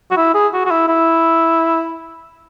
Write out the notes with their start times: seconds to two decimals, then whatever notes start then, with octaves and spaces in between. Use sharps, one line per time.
0.11 F#4
0.17 E4
0.34 G#4
0.53 F#4
0.65 F#4
0.71 E4
0.88 E4